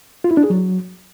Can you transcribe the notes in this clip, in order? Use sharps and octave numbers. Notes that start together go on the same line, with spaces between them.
F4
E4
D4
G#4
F#3